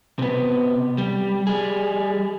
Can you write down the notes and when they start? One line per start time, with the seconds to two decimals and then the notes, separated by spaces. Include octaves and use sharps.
0.19 C3 B3
0.98 G3
1.47 G3 G#4